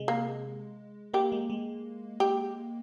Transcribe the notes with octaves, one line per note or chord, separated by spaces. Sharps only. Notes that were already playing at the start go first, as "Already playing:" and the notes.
Already playing: C3 G#3
A#3
A#3 G4
G#3
G#3
G4